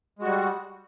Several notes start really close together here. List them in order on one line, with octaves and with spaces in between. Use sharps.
G#3 F#4 G3